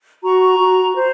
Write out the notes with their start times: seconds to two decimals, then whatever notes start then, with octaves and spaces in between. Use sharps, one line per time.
0.24 F#4 A#5 C#6
0.59 F#4
0.95 C5